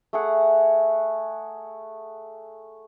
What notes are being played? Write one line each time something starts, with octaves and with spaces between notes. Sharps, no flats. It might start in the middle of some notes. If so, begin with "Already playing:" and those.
A3 G#4 F#5